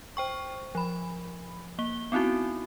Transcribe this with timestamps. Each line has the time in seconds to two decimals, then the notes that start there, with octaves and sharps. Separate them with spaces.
0.17 C5 G5 C#6
0.75 F3 B5
1.79 A#3 G7
2.12 B3 C4 D#4 E4 F#4